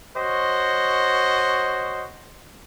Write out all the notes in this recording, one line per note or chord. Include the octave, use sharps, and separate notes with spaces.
F#4 C5 C#5 D#5